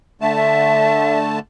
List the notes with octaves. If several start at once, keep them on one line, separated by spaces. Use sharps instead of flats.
D3 A3 E5 A5
E5